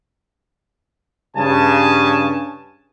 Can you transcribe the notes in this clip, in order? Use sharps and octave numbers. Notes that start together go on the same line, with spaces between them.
G2 C#3 G#5 A5